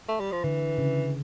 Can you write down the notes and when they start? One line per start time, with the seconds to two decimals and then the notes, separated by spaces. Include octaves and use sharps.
0.08 A3
0.20 G3
0.32 F3
0.43 D3 E3
0.78 C#3